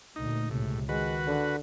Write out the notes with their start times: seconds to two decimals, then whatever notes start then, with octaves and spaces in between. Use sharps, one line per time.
0.16 D2 A#2 D#4
0.51 C#2 A2 C3
0.89 D#3 G#3 F#4 B4
1.27 D3